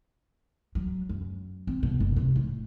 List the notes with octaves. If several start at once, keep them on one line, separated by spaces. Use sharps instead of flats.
F#3
F#2
C4
B2
F#1
C3
A2